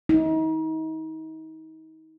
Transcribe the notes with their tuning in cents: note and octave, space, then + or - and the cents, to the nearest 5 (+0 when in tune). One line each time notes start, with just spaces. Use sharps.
D#4 +35